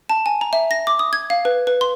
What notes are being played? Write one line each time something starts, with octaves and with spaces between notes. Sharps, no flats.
A5
G#5
A#5
E5
A#6
D6
D#6
G#6
F5
B4
B4
C6